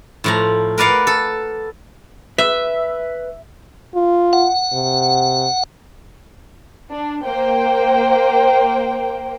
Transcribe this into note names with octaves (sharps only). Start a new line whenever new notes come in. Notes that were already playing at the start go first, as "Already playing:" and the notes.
A2 F3 A#5
A#4 B4 D5 F5 F#5
A4
B4 E5
F4
F#5
C3
D4
A#3 C5 G5